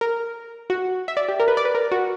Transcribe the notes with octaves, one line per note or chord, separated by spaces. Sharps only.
A#4
F#4
E5
D5
G4
A#4
B4
D5
B4
A#4
F#4